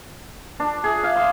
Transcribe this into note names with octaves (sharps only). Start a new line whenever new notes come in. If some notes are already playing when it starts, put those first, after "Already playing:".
D4
G#4
F5
C6